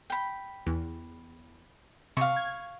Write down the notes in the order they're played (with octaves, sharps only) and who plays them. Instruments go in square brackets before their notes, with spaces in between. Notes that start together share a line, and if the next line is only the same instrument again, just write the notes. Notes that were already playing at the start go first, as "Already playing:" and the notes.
[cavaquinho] G5 B5
[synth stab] E2
[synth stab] C3 [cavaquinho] F5 C#6
[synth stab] G#6